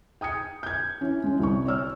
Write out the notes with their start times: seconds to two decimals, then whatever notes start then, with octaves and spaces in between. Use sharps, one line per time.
0.21 G5 D#6 G#6 C#7
0.63 G6 G#6
1.01 E3 C#4
1.24 G#3 C#4
1.39 C2 C4 C#6
1.65 C#5 D5 E6 F6